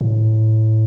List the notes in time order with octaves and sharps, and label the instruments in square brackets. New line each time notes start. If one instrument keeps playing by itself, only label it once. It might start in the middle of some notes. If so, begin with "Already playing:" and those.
[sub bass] A2